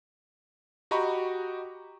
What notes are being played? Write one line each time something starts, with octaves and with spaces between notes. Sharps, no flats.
F#4 G4 D#5 A#5 B5 C#6